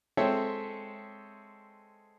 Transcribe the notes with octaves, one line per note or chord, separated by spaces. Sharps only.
G#3 C4 A4 C#5 E5 G5